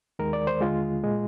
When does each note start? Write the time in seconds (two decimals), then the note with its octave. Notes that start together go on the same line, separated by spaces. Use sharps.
0.19 D#2 D#3 G#3 A#4
0.33 D5
0.47 C5
0.61 D#2 D3 G#3 F4
1.04 A#2 G#3